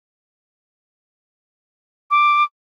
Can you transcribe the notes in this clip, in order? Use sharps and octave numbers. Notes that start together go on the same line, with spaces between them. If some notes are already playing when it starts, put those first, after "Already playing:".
D6